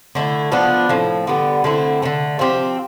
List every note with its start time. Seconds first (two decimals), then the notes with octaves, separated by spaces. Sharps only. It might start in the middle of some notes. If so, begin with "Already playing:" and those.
0.15 D3 A3 E4
0.52 F3 B3 D4
0.89 A2 F3 C4
1.27 D3 G3 B3
1.64 D3 A3 C4 E4
2.02 D3 F3 A3
2.39 F3 C4 G4